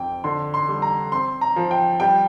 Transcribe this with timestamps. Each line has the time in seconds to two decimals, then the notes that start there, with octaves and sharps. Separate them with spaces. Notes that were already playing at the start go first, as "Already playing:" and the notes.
Already playing: F2 C4 G5
0.24 D3 C6
0.54 C6
0.69 G3
0.82 A#5
1.12 C4 C6
1.41 A#5
1.56 F3
1.71 G5
2.00 G3 G5